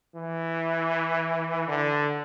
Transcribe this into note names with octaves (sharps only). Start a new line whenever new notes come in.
E3
D3